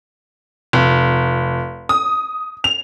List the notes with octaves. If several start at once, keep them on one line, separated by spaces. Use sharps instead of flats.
F1
D#6
F7